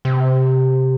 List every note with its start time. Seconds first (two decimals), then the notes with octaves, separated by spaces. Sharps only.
0.05 C3